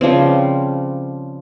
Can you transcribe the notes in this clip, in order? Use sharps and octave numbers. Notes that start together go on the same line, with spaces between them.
C#3 F3 G3 C4